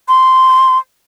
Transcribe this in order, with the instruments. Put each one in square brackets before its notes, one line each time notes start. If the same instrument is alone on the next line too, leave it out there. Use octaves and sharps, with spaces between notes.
[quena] C6